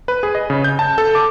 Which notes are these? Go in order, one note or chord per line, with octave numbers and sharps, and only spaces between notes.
B4
G#4
D#5
C#3
G6
A5
A4
D6